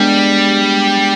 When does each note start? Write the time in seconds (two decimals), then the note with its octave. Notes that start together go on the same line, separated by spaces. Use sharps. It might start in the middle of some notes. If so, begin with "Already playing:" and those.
Already playing: G3 G#3 B3 D4